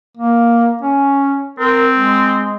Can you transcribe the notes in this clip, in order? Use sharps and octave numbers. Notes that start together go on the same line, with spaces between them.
A#3
C#4
C4 A#4
G#3